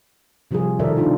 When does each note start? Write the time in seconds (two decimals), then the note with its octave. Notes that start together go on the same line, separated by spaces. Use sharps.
0.51 C3 F3 G3 F4 G#4
0.79 B2 D#3 A4 A#4 D5 E5
0.97 D4 D#4 F4 G#4